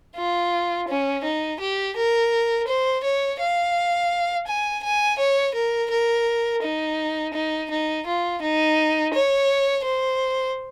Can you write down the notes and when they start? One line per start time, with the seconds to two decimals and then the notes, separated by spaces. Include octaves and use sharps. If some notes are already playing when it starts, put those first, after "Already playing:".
0.16 F4
0.89 C#4
1.24 D#4
1.60 G4
1.97 A#4
2.68 C5
3.04 C#5
3.40 F5
4.47 G#5
4.83 G#5
5.19 C#5
5.55 A#4
5.91 A#4
6.63 D#4
7.34 D#4
7.70 D#4
8.07 F4
8.42 D#4
9.14 C#5
9.85 C5